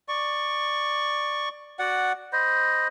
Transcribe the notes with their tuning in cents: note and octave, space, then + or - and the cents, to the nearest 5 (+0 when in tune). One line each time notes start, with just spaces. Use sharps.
D5 +10 C#6 +0
F#4 +0 D5 +0 F#5 +0
C5 +0 D#5 +0 B5 -5